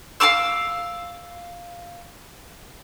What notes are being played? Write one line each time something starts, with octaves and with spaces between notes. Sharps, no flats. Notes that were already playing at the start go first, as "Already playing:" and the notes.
F5 A#5 D6 E6